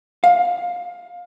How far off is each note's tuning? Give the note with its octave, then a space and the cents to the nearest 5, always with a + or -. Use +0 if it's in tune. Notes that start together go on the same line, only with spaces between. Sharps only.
F5 +20